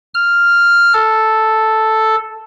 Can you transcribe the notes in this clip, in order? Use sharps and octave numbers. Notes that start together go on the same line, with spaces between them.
F6
A4